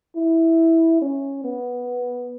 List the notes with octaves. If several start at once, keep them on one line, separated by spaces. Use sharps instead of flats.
E4
C#4
B3